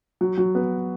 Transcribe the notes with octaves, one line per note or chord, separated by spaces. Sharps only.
F#3
F#3
B3